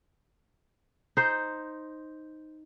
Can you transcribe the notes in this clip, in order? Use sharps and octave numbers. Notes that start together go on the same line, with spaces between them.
D#4 C5